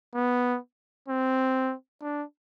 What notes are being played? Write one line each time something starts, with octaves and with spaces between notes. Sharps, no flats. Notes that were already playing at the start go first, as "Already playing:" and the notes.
B3
C4
D4